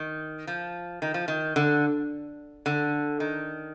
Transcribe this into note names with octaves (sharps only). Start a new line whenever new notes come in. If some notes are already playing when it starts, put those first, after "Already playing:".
Already playing: D#3
F3
D#3
F3
D#3
D3
D3
D#3